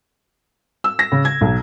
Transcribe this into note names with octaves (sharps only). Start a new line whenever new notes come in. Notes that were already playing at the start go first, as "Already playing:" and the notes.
E6
A#6
C#3
G#6
B1